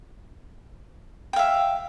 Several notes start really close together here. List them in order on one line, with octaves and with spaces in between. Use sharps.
G5 F5 E5